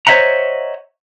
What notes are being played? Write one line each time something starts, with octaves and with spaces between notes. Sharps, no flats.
C5 C#5 D#5 E5 F#5 A#5